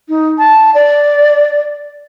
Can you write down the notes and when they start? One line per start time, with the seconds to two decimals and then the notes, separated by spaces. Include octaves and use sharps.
0.09 D#4
0.38 A5
0.75 D5